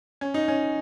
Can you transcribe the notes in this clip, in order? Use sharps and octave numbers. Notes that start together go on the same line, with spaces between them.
C#4
D#4
C#4